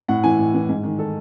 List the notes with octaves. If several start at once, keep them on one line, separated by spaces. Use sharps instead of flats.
A2 F#5
E3 G#5
A2
E3
G#2
D#3
A4